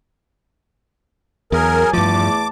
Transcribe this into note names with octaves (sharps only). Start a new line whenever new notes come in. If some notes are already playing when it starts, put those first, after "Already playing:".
E2 F#3 G#4 A#4
E2 G2 F3 A3 A5 D6